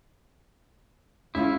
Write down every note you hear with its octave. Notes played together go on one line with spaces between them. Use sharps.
G#3 C#4 E4 F4